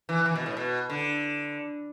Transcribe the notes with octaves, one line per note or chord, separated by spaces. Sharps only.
E3
E3
B2
A2
B2
D3